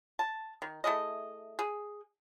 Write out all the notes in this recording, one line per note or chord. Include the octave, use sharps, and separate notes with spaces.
A5
D#3
A3 E4 G#4 D#5
G#4